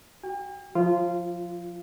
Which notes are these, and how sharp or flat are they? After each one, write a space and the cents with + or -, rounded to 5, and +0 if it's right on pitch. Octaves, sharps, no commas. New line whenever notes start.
F#4 +25 G5 +45
F3 +25 F4 -15